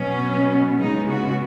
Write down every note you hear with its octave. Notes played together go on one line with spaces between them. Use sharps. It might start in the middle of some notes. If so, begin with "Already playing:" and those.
Already playing: B2 F#3 B3 C#4
C#3 G#3 B3 D#4
F#4